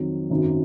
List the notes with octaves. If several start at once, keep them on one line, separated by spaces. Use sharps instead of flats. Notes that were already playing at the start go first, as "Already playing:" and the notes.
Already playing: F2 D#3 F#3
G#1 F#2 D#3 F#3